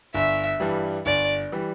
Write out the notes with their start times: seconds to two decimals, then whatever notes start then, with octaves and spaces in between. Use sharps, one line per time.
0.14 G1 E5
0.60 G2 E3 G3
1.06 G1 D5
1.52 E3 G3